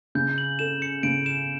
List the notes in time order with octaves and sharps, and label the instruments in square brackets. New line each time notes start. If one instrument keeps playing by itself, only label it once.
[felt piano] C#3 [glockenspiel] G6
[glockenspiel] F#7
[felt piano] A4 [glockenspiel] E7
[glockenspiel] C#7
[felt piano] C#3 [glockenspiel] D7
[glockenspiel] E7